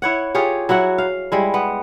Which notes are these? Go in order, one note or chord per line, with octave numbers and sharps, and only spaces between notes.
E4 C#5 F#5
F4 G4 G#4 C#5
F#3 E4 F#4 F#5
F5
G3 G#3 E4
B3